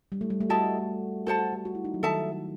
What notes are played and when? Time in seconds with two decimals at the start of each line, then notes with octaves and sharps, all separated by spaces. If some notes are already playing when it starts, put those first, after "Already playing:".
0.12 G3
0.21 A3
0.30 G3
0.41 A3
0.49 E4 F#4 A4 D#5 A5
1.27 F#4 A4 C5 F#5 A5
1.39 F#4
1.53 G4
1.65 F#4
1.75 E4
1.85 D#4
1.94 F#3
2.03 D#3 D#4 A4 E5 A5